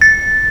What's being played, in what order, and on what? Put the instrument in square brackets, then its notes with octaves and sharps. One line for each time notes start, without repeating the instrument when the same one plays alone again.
[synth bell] A6